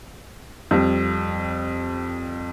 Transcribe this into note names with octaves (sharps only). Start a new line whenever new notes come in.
F2 G3